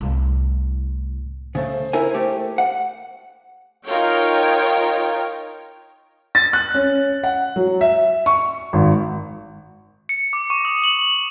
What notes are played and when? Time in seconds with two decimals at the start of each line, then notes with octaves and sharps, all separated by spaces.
0.01 C2 A2
1.55 C#3 A3 C5
1.93 E4 A#4 G#5
2.14 A3 G4
2.58 F#5
3.85 D#4 F4 A#4 C#5 G5
6.35 A6
6.53 F#6
6.74 C#4
7.23 F#5
7.56 F#3
7.81 E5
8.26 C#6
8.73 G#1
10.09 C#7
10.33 D6
10.50 C#6
10.65 D#6
10.84 F#7